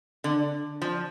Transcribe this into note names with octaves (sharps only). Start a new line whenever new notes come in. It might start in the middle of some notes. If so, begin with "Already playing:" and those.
D3
F3